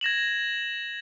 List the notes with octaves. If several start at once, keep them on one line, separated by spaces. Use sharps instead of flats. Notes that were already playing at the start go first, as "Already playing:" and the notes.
G#6 A#6 E7 F#7